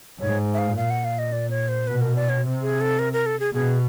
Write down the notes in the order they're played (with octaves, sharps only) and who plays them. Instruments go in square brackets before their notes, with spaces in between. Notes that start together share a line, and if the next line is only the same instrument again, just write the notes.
[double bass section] G#2 [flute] C#5
[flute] E5
F5
[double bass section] A#2 [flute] F5
[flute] F#5
F5
D#5
D5
C#5
C5
[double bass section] B2 [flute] B4
[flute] A#4
D5
C#5
[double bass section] C3
[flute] G#4
A4
A#4
A#4
A4
G#4
[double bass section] B2 [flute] G#4